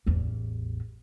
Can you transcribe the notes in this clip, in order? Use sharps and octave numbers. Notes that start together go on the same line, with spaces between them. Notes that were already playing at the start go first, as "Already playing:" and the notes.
A1 E2